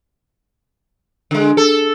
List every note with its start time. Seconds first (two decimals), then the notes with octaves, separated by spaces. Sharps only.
1.31 D3 G#3
1.57 A4